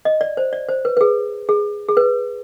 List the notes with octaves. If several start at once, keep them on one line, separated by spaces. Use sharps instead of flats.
D#5
D5
C5
D5
C5
B4
B4
G#4
G#4
G#4
B4